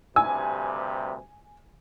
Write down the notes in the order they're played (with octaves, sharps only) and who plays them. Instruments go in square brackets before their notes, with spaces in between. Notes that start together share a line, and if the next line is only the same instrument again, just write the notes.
[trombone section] D2 G2 C3 [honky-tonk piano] G#5 [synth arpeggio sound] E6